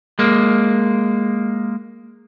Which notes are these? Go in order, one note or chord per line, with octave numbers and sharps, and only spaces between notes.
G#3 A#3